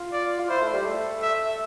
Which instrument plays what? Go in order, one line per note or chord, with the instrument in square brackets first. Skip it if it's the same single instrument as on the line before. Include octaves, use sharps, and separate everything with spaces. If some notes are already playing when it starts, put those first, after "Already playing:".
Already playing: [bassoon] F4
[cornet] D5
[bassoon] F4
[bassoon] E4 [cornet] C5
[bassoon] A3
G3
A3
[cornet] E5